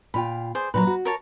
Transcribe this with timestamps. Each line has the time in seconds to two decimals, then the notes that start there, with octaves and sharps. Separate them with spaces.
0.14 A#2 F4 G5 B5
0.55 G#4 C5 D5
0.74 A#2 D#3 F#3 B4 A#5
0.87 F#4
1.05 A#4 C#5 A5